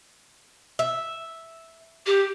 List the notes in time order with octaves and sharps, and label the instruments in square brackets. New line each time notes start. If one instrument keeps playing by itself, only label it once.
[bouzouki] E5
[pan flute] G4